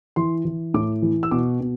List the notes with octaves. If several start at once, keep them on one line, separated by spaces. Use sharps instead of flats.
E3 C6
E3
A2 D6
E3
E6
B2 D6
B2